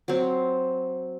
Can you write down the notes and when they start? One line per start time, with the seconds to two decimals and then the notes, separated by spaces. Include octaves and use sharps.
0.08 F#3 C4